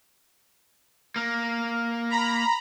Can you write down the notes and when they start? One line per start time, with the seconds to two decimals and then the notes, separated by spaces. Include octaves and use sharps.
1.16 A#3
2.10 A#5 B5